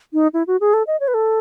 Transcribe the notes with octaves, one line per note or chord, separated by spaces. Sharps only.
D#4
E4
F#4
G#4
A4
D#5
C#5
B4
A4